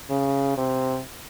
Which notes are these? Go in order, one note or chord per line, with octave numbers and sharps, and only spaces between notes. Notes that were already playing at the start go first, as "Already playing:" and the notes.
C#3
C3